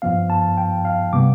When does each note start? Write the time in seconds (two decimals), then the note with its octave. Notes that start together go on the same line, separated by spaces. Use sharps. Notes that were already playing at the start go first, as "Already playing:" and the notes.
0.02 G2 F3 B3 F5
0.30 A5
0.57 G5
0.85 F5
1.13 C3 G3 B3 D6